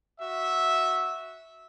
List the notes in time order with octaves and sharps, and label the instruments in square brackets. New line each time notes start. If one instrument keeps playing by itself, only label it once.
[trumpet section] F#4 E5